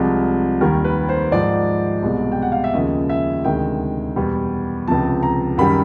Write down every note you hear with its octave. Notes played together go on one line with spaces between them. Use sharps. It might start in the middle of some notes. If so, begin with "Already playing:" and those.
Already playing: C2 C3 F3 G#3
D#2 D#3 G3 A#4
B4
C5
G#2 F3 G#3 D5
C2 B2 G#3
G5
F#5
F5
E5
D#2 C#3 F3 G#3 D#5
E5
D2 C3 D#3 G#3 G5
E2 B2 G3
C#2 C3 F3 A5
A#5
F#2 D#3 G3 B5